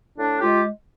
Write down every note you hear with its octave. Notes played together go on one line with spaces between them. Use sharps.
A2 D4
G#3 F4 G4